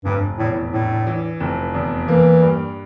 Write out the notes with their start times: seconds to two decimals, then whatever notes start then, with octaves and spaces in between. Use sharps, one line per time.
0.04 F1 G2
0.39 E2 A2
0.73 A2 D4
1.07 E3
1.40 F1
1.74 E2
2.08 E3 A#3
2.42 G2